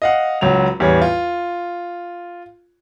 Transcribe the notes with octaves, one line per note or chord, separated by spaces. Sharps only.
D#5 F5 F#5
C#2 F#3 F7
A1 E2 G3 C#5
F4